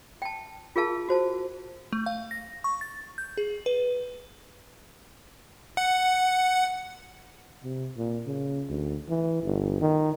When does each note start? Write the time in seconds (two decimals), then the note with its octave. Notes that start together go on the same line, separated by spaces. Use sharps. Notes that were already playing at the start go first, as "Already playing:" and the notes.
0.22 G5 A5
0.76 F4 G#4 A#4 F5 A5
1.09 F#4 C5 A5
1.93 A3
2.06 F5
2.31 A#6
2.64 C#6
2.81 A6
3.18 G6
3.37 G#4
3.66 B4
5.77 F#5
7.64 C3
7.97 A#2
8.27 C#3
8.69 D2
9.09 E3
9.44 G1
9.81 D#3